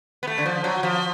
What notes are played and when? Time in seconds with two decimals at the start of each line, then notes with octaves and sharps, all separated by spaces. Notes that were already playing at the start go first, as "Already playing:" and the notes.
0.23 B3
0.27 A3
0.38 D3
0.46 F3
0.64 F#3
0.83 F3